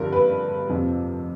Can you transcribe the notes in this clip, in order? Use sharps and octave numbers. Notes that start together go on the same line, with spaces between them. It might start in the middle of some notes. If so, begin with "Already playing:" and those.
Already playing: G2 D3 F3 A#4
B4
F2 C3 F3